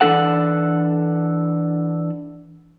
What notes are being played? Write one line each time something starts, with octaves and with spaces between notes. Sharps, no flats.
E3 G#3 D4 A4 F#5